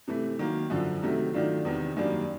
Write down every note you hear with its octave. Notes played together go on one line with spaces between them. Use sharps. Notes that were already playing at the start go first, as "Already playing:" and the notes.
C3 E3 A3
D#3 F#3 A#3
F#2 D3 F3
C3 D#3 F#3 A3
D#3 F#3 A3 D4 F4
E2 C3 D#3
F#2 D#3 G3 A#3 D4